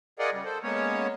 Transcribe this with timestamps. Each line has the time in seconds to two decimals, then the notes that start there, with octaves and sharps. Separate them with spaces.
0.19 F4 G#4 A#4 D5 D#5 F#5
0.33 C#3 G3
0.45 A4 C5
0.63 G#3 A#3 B3 C#4 C#5